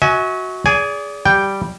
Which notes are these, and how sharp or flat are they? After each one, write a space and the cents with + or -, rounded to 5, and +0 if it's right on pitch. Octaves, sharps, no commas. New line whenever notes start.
F#4 +0 E5 -40 G#5 +10
G#4 +0 D5 -35 G#5 +0
G3 -5 G5 +0